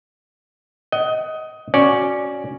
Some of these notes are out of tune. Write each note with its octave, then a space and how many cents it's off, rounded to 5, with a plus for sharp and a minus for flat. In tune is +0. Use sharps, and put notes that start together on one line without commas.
D#5 +15 F#5 +25
C#4 +0 F#4 +0 D5 +0